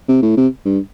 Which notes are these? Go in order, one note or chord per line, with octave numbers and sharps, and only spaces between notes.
C3
A2
C3
G2